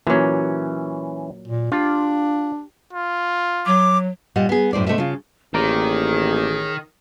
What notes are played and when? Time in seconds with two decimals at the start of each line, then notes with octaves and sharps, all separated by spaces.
0.07 A#2 E3 F#3 C#4
1.48 A#2
1.72 D4 F4 G4
2.93 F4
3.66 F#3 D6
4.36 A#2 G3 D#5 F#5
4.49 B3 G#4
4.73 F#2 A2 C5 D5
4.86 C3 A3 D#5 E5
4.98 C#3 F4
5.54 A1 D#3 A#3 G#4 A#4 C#5 D5